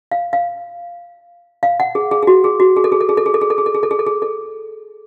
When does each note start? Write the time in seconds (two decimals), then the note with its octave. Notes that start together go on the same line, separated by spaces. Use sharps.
0.11 F5
0.33 F5
1.63 F5
1.80 F#5
1.95 G#4
2.11 G#4
2.23 G#4
2.27 F#4
2.44 G#4
2.60 F#4
2.76 G#4
2.84 A4
2.92 G#4
3.01 A4
3.09 G#4
3.17 A4
3.26 G#4
3.34 A4
3.41 G#4
3.50 A4
3.58 G#4
3.66 A4
3.75 G#4
3.83 A4
3.91 G#4
3.99 A4
4.07 G#4
4.22 A4